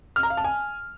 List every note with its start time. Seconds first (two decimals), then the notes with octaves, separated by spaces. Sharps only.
0.16 F6
0.23 A#5
0.30 F5
0.37 A5
0.44 G#5